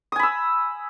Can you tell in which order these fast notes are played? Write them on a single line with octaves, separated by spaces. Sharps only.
D#6 G#5 B5 E6